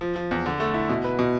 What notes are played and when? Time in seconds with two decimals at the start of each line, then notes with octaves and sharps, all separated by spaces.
0.01 F3
0.16 F3
0.31 E2
0.46 D3
0.60 A3
0.74 E4
0.90 B2
1.04 B4
1.19 B2